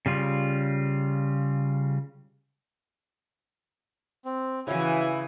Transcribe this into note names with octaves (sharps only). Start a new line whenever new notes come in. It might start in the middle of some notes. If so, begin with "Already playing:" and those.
C#3 G3 F4
C4
C#3 E3 C#4 E4 F#4 G#5